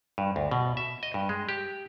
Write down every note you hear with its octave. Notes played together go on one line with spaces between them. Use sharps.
G2
D2
B2
E5
D#5
G2
G#3
G4